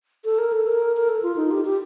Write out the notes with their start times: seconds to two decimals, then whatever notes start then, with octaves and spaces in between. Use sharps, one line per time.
0.25 A4
0.39 A#4
0.53 A4
0.67 A#4
0.97 A#4
1.09 A4
1.23 F4
1.36 D#4
1.51 G4
1.65 G4